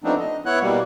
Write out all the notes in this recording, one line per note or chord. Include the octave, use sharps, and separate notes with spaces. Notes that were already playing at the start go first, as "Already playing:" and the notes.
F3 A3 B3 C4 D4 D#4
D#5
B3 E4 C#5 F#5 F#6
B2 G3 A#3